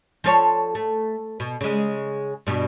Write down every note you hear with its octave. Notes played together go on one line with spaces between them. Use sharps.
F3 A4 C#5
A3
B2
C#3 G#3
G2 B2